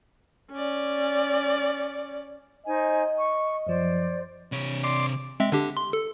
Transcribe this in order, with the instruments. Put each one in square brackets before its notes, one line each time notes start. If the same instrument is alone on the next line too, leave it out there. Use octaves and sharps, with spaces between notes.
[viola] C#4 D5
[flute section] D#4 C5 G#5 [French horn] D#5
[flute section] C#6
[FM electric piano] F#2 F3 [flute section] C5 D5
[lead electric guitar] C3 C#5
[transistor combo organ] D5 C6 D6
[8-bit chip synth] G#3 C4 E5
D3 D4 G4
C6
A4